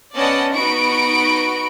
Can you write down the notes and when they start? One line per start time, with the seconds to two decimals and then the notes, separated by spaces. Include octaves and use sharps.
0.15 B3 C#4 D5 D#5 F#5 A5
0.55 B3 D#4 F#4 B5 C#6 D7